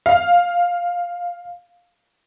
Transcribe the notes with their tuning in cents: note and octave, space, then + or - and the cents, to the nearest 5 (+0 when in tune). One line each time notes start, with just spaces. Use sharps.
F5 +5